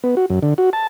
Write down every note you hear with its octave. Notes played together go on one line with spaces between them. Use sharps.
B3
F#4
F#2
D3
F#4
A5